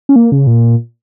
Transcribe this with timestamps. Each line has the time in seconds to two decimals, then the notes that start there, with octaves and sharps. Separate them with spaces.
0.09 C#4
0.16 A#3
0.32 C#3
0.47 A#2